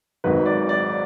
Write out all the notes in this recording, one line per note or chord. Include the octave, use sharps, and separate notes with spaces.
G#1 G#2 D#3 F#3 B4
D5
D5